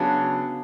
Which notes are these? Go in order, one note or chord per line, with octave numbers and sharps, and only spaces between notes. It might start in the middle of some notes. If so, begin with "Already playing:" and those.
Already playing: C#3 F#3 B3 D4